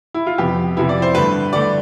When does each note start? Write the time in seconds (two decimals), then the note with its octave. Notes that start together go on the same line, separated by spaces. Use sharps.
0.14 E4
0.26 F4
0.38 F2 C3 F3 B3 G4
0.77 F2 C3 F3 B3 E4
0.89 D5
1.02 C5
1.15 G2 D3 A3 B4
1.53 G2 D3 A3 D5